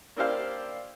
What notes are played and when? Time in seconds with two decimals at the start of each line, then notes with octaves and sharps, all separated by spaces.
0.16 A#3 D4 E4 G4 C5 F5